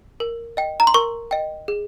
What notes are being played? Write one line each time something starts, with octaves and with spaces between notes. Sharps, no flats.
A#4
D#5 G5
A#5
C6
A#4 C#6
D#5 G5
G#4